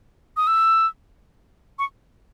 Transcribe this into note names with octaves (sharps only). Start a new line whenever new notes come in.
D#6
E6
C#6